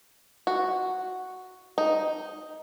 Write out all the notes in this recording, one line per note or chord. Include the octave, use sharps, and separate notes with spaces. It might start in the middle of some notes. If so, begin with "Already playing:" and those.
F#4
D#4